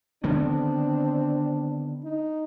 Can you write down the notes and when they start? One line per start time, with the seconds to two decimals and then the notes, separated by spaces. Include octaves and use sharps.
0.24 D3 D#3 B3 C4 D4
2.04 D#4